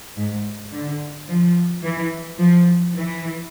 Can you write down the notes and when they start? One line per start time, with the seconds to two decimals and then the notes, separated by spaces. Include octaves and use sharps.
0.17 G#2
0.73 D3
1.28 F3
1.83 E3
2.38 F3
2.94 E3